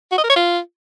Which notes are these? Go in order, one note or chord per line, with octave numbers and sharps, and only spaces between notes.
F#4
D#5
A#4
C#5
F4